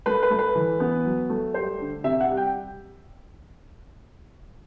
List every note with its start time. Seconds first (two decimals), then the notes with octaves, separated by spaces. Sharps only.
0.06 A3 B4
0.23 B4
0.31 A3
0.39 B4
0.55 E3
0.80 B3
1.04 F#3
1.30 A3
1.54 G3 C5
1.79 D3
2.04 C3 E5
2.20 F#5
2.29 G3
2.37 G5